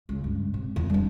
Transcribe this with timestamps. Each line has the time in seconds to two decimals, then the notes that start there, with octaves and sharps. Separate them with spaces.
0.09 C#2
0.24 G2
0.54 C3
0.76 E2
0.90 G3 D4